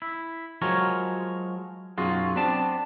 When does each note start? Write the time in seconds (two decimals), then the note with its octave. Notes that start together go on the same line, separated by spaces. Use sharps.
0.02 E4
0.62 F3 F#3 G#3 A#4 C#5
1.98 B1 F#2 F#3 F4 F#4 G#4
2.36 B3 C4 D4 D5 A5